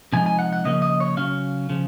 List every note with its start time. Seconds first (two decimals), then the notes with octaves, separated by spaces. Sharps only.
0.13 C3 F3 G#3 D#4 G#5
0.26 G#5
0.39 F#5
0.53 F#5
0.65 C#3 F3 A#3 C#4 D#5
0.82 D#5
1.00 C#5
1.17 C#3 F#3 C#4 F5
1.69 C#3 F3